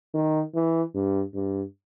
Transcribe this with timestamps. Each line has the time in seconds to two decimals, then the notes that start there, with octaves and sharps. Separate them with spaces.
0.14 D#3
0.55 E3
0.94 G2
1.34 G2